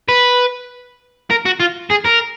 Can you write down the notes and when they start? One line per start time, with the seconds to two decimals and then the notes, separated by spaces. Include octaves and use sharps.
0.08 B4
1.31 A#4
1.46 F#4
1.60 F4
1.91 G#4
2.06 A#4